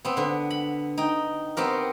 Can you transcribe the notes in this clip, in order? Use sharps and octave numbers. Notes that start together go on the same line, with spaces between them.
B3 C4
D3 B3
B5
D#4 G5
B3 C4 G4 A#4